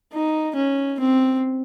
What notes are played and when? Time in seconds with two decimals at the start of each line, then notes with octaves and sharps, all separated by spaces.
0.13 D#4
0.56 C#4
1.00 C4